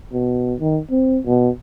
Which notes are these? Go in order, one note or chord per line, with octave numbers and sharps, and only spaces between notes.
B2
D#3
C4
B2